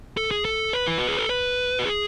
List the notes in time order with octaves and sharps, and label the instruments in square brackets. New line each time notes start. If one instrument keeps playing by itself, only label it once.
[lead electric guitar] A4
G#4
A4
B4
E4
F#4
G#4
A4
B4
F#4
G#4